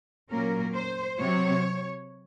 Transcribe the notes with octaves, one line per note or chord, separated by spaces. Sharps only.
A#2 F#3 A#3 C#4 A#4
C5
C3 F#3 C4 C#5